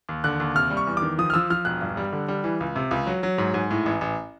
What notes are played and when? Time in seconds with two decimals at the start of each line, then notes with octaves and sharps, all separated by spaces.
0.09 D#2
0.24 D3 F#6
0.40 D#2
0.55 C3 F6
0.70 G3
0.77 C#6
0.87 E2
0.97 D6
1.02 D#3
1.18 F3 D#6
1.30 F6
1.34 F3 E6
1.50 F3 F6
1.65 E1 F#6
1.81 G2
1.97 G3
2.13 D3
2.28 G3
2.44 E3
2.60 C#2
2.76 C3
2.91 C#2
3.07 F#3
3.23 F#3
3.38 G#2
3.54 G#2
3.71 A2
3.86 A1
4.01 A1